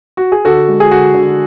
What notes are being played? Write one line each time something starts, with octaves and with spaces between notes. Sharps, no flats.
F#4
G#4
D3 F#4 A4
G#3
G#4
D3 F#4
D3